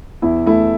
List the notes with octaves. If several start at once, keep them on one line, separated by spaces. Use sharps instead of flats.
E2 E4
A3 E4